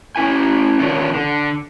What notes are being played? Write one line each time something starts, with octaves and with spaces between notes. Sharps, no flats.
C#4 E4 G#5
D3 D#3 C#4 D4 F4 C#5
D3